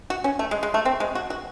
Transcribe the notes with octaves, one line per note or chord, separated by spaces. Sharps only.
F#4
C#4
A3
G#3
G#3
A3
C4
G#3
F#4
F#4